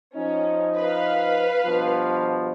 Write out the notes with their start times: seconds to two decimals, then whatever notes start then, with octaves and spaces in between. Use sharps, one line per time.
0.17 F3 C#4 D#4
0.77 B4 F5
1.65 G2 B2 F3